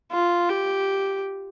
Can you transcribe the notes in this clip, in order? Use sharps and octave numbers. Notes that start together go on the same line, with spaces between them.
F4
G4